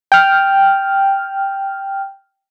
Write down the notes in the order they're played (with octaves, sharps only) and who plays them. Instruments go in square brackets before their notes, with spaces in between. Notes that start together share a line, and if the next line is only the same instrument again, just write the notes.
[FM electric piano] G5 F6